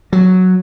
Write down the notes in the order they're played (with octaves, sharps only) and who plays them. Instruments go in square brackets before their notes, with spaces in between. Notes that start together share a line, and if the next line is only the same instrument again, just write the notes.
[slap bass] F#3